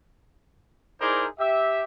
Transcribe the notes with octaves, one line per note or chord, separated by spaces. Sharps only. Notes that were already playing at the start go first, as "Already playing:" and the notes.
D#4 E4 G#4 A#4 C5 D5
G4 E5